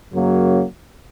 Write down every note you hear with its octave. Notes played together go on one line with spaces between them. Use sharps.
F#2 C#3 F#3 A#3